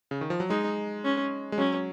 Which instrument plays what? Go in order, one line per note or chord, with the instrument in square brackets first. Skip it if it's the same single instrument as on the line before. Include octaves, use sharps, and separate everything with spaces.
[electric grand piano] C#3
D#3
F3
F#3
[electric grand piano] G#3 [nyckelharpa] D#4
[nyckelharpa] C#4
[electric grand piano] G#3
[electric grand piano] F#3 [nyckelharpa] C#4